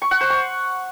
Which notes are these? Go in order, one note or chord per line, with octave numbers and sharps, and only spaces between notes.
C#6
F#5
C5
C#6